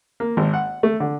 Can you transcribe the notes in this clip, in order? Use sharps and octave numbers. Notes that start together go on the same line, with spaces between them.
A#3
G#1
F#5
A3
D3